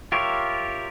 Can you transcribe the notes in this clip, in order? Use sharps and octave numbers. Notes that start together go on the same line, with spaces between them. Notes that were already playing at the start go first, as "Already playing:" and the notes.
F4 G4 A#4 C#5 E5